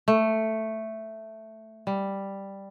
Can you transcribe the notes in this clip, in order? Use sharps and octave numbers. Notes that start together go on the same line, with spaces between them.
A3
G3